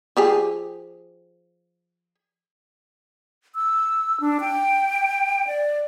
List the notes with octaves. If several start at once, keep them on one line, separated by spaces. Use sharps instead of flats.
F3 G4 G#4
E6
D4
G5
D5